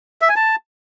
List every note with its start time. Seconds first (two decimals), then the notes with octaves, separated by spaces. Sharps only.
0.22 E5
0.29 G#5
0.36 A5